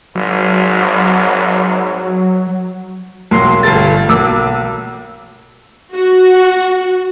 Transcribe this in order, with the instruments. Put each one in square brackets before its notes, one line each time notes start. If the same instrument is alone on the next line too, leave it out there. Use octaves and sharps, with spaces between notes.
[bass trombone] G#1 [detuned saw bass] F#3
[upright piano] E1 B1 F#3 A#3 C6 C7
G1 G2 A3 A4 A6
B1 A#3 D6 E6
[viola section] F#4